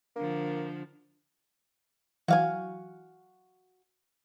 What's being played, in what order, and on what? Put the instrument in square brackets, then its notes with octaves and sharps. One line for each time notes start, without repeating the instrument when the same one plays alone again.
[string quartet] D3 F3 [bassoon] A#3
[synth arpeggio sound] E3 F#3 [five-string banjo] F#4 F5 G#5